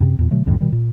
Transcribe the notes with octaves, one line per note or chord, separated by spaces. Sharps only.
F#2 C3 C4
E2 A#2
B2 D3 F#3 A3
C2 F#2 A2 D#3
B2 D#3 G3
A#2